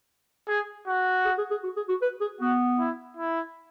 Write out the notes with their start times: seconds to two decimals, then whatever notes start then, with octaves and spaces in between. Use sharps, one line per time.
0.48 G#4
0.87 F#4
1.25 G#4
1.38 G#4
1.50 G#4
1.63 F#4
1.76 G#4
1.88 F#4
2.02 B4
2.21 G#4
2.40 B3 F#4
2.79 E4
3.17 E4